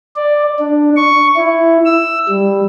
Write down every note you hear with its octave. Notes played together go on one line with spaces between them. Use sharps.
D5
D4
C#6
E4
E6
G3